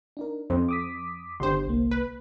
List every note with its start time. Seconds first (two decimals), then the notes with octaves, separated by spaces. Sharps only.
0.17 D4 D#4 A#4
0.50 F2 C5
0.69 D6 D#6 B6
1.40 G1 D4 G4 C5 C6
1.66 C2 A#3
1.91 B4